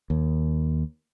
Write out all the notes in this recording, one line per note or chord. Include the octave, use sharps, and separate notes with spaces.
D#2